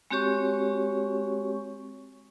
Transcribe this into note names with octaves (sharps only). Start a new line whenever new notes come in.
G#3 C4 F#4 G4 C#5 C#6